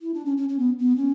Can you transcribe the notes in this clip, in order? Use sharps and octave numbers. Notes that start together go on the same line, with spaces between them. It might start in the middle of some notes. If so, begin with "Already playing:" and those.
E4
D4
C#4
C#4
C#4
B3
B3
C#4